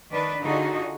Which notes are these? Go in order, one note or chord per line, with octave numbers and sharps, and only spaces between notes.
D#3 D4 B4
D3 D#4 F4 F#4 G#4